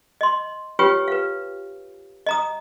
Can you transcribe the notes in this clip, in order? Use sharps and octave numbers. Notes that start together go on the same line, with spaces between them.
D#5 C6
F4 G4 B4 C#5 G5
B4 F5
D#5 A#5 D#6